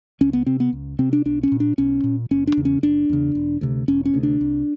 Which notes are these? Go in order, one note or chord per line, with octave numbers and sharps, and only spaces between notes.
C#2 C#4
B3
C3 C4
B3
C#2
C3 C4
D4
B1 D4
C#4
A#2
D4
B1 C#4
A#2
F#1 C#4
D4
E2 C#3
C#4
F#1 D4
E2 C#3
E1
D2 C3
E1 C#4
C#4
D2 C3
D4
C2